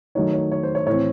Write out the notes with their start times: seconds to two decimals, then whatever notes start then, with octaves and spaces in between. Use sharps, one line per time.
0.15 D#3 F#3 A3 D#4 C#5
0.33 C#5
0.52 C#5
0.63 C5
0.75 C#5
0.87 A2 E3 C4 C#5